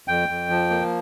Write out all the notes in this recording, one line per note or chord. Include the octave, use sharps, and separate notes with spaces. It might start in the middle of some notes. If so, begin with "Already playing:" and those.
F2 G5
F2
F3
A#3